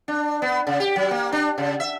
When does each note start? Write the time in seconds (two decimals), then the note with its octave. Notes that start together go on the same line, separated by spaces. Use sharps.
0.08 D4
0.42 B3
0.67 C#3
0.80 G4
0.96 F#3
1.11 A#3
1.33 D4
1.58 C#3
1.80 E5